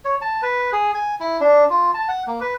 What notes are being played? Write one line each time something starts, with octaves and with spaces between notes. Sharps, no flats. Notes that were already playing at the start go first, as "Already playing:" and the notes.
C#5
A5
B4
G#4
G#5
E4
D4
F4
A5
F#5
A#3
B4